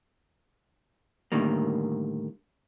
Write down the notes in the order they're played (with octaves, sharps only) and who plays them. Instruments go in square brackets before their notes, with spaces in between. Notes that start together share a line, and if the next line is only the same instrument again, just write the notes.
[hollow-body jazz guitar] A2 D3 D#3 G3 A#3